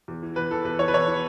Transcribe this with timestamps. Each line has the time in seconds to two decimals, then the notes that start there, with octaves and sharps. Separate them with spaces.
0.08 E2
0.23 E3
0.36 E2 B4
0.51 E3 A4
0.65 E2 B4
0.79 E3 C#5
0.88 B4
0.94 E2 C#5
1.08 E3